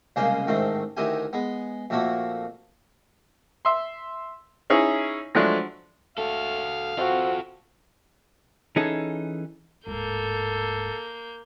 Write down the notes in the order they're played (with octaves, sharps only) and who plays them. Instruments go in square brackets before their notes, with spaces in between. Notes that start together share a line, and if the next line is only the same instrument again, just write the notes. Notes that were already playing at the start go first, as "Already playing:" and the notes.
[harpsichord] C2 C#3 G#3 A#3 G#4 C5
A1 G#2 D#3 A3 C4
D2 D#3 D#4 E4 G4 G#5
G#3 B3
F2 A#2 A3 A#3 F#4
[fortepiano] E5 C6
C#4 D#4 E4 G#4
F3 F#3 G#3 A3 D4
[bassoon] A3 [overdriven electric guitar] F#4 A4 [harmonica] F5
[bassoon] C4 [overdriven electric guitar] F4 A4 [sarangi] F#4
[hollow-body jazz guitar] E3 C#4 D#4 G#4 A4
[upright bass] D1 G#2 [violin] A#3 G6 [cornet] A4